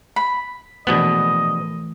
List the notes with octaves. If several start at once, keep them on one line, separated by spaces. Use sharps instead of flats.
B5
A#1 B2 E3 A3 B3 D#5